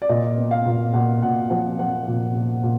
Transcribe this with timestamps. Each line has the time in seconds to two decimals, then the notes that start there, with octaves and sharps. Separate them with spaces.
0.02 D5
0.09 A#2 D#5
0.38 B3
0.51 F5
0.66 A#2
0.93 A#2 F#5
1.22 A#2 F#5
1.50 F3 F#5
1.79 F3 F#5
2.07 A#2
2.35 A#2
2.63 A#2